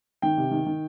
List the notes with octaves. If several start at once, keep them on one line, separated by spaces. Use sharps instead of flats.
D#3 G5
C3
D#3
D#3